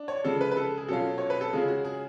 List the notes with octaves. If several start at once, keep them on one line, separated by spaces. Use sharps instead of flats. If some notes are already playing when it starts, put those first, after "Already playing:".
Already playing: D4
C#5
C#3 F3 G#3 A4
B4
B4
A4
G#4
B2 F#3 C#4 F4 A4
C#5
B4
A4
C#3 G#3 C#4 F4 G#4
F#4
G#4